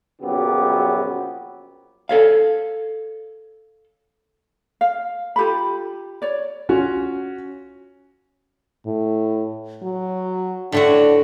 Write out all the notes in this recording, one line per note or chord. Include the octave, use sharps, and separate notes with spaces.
A#1 F#2 C#3 F#3 B3 G4
A4 C#5 F5
F5
F4 G4 A4 B5
C#5 D5
C#4 F4 F#4
A2
F#3
A2 D3 D4 F#4